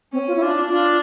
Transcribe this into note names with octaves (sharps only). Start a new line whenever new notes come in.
C4 C#4
F4
E4
D4 F4
D4 F4